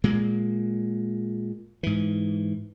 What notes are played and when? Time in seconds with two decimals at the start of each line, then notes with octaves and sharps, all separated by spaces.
0.04 A#2 G#3 A#3
1.83 G#2 E3